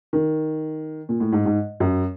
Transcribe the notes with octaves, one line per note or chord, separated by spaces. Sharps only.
D#3
A#2
A2
G#2
G#2
F#2